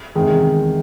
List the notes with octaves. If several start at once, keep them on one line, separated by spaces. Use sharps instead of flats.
E2 C3 D#3 G#3